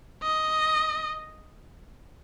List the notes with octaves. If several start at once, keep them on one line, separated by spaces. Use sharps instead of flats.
D#5